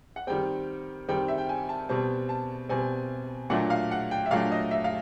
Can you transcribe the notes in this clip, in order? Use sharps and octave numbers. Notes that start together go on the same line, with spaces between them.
F#5
D#3 G3 C4 G5
D#3 G3 C4 G5
E5
G5
G#5
A5
B2 G3 C4 A5
A5
B2 G3 C4 G#5
A#2 F#3 A3 D4 F#5
F5
F#5
G5
E5
A#2 F#3 A3 D4 F5
D#5
E5
F5